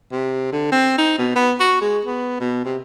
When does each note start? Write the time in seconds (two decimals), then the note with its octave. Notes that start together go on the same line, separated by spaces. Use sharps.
0.12 C3
0.53 D3
0.72 C4
0.98 D#4
1.18 B2
1.36 B3
1.60 F#4
1.81 G#3
2.05 B3
2.40 B2
2.65 C3